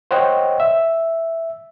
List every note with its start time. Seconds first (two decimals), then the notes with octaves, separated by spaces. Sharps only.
0.11 C5 C#5 D#5 F#5 G5
0.60 E5